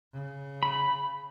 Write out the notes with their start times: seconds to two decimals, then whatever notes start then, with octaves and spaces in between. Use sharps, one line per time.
0.13 C#3
0.63 B5